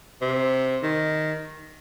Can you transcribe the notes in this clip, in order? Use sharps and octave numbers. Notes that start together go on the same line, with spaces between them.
C3
D#3